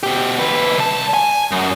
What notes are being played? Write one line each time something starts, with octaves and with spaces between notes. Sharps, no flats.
B2 G4
D#2 B4
C2 A5
G#5
F#2